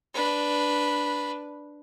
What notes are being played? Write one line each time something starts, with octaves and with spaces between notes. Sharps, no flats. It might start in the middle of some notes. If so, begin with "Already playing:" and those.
D4 B4